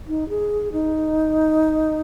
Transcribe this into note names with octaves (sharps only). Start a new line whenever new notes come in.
D#4
G#4
D#4